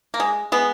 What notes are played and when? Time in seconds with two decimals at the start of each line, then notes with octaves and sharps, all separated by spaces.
0.14 A#3
0.20 G#3
0.52 G#3 B3